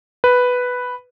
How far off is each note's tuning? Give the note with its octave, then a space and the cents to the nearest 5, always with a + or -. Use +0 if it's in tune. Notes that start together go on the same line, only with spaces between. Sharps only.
B4 +0